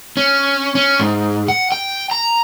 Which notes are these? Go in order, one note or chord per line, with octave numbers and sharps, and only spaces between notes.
C#4
C#4
G#2
F#5
G5
A#5